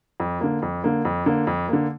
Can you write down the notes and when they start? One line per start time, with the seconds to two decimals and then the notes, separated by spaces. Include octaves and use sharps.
0.20 F2
0.41 D3 A#3
0.62 F2
0.84 D3 A#3
1.05 F2
1.26 D3 A#3
1.47 F2
1.69 D3 A#3